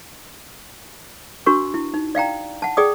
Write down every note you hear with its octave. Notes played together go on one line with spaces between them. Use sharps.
D4 F#4 A#4 C#6
E4
D#4
D5 F5 G5 A#5
F#5 A5
G#4 D5 G5 D#6